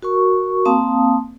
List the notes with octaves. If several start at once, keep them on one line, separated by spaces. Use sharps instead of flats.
F#4 A#4 C#6
A#3 C4 F5 A5 D#6